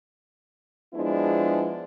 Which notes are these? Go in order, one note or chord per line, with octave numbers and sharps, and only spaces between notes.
F3 G#3 B3 D4 E4